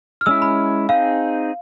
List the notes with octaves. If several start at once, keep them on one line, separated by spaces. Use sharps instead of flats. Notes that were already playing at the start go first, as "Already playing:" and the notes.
F6
G#3 C#4 E4 E6
B5
C4 D#4 G#4 F5